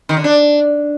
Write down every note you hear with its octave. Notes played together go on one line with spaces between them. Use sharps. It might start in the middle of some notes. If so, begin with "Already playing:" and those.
D#3
D3
D4